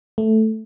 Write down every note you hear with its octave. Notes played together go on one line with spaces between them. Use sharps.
A3